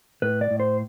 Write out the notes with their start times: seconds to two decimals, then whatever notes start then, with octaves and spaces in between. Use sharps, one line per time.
0.22 A2 B4
0.41 D5
0.51 A2
0.60 C5